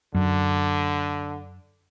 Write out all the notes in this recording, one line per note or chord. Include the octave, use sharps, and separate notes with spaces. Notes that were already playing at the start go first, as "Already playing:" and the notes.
F#2 D3